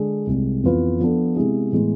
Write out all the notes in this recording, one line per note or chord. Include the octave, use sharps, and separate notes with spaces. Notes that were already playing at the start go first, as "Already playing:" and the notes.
Already playing: D3 G#3 D4 G#4
C2 C3 G#3
F2 E3 B3 F4 B4
F3 B3 D4 A4
C3 G#3 B3 E4 G#4
A2 E3 G#3 B3